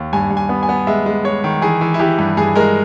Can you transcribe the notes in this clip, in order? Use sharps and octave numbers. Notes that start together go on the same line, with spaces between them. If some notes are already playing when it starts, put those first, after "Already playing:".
Already playing: D#2
G2 G#5
G2
G#5
B3
G#5
B3
G#3 E5
G#3
G#3 C#5
D#3
E3 G#4
E3
E4
E3 G4
G2
G2 G#4
G#3 A#4